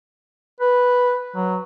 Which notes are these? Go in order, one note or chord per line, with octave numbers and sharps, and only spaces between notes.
B4
F#3